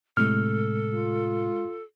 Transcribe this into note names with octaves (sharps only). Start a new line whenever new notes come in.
A2 C3 G#3 A4 F6
F4